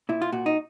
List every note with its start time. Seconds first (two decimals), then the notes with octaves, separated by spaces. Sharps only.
0.09 A#2 E4
0.22 F4
0.32 A#2 F#4
0.46 D#4